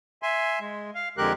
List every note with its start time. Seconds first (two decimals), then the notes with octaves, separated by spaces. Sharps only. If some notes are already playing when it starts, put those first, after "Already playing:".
0.23 E5 G#5 C6
0.60 G#3
0.95 F5
1.18 F2 D3 G#3 G4 A#4 F#6